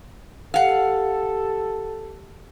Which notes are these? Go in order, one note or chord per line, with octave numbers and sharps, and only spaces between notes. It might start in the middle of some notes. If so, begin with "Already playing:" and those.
G4 A4 F5 F#5